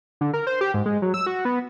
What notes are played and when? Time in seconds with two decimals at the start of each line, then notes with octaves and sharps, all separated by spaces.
0.21 D3
0.34 A#4
0.47 C5
0.61 G4
0.74 G#2
0.86 G#3
1.02 F#3
1.14 E6
1.26 F#4
1.45 B3